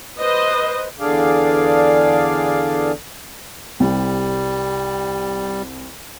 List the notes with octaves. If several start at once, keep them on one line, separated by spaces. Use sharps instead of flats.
B4 C5 D#5
E2 D3 D4 G#4 D5 F5
C2 G3